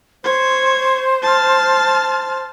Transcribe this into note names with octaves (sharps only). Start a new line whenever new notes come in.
C5 C#5
A5 F6